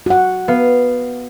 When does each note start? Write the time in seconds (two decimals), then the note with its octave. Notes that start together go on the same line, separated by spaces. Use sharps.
0.06 F#4 F#5
0.48 B3 F5